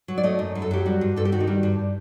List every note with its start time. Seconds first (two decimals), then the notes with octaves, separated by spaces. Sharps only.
0.08 F#3
0.18 D5
0.23 A3 D#5
0.39 F#2
0.55 F#2
0.62 A4
0.71 F#3 G4
0.86 G3 F#4
1.01 G2
1.16 G2 A4
1.25 G4
1.32 D#3 F#4
1.40 D#4
1.47 G3 D4
1.63 G2